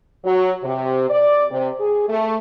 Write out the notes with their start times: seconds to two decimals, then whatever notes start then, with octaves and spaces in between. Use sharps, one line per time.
0.24 F#3
0.63 C3
1.09 D5
1.51 C3
1.80 G#4
2.09 A3